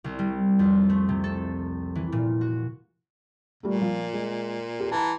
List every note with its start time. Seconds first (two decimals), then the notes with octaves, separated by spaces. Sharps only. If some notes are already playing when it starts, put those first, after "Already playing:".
0.04 C2
0.19 G3
0.59 F2
0.90 A3
1.09 C3
1.24 A4
1.95 E3
2.12 A#2
2.41 F#4
3.63 A#2 G3 A3
3.81 F3
4.13 G#3
4.80 G4 A4
4.91 E3 A5 A#5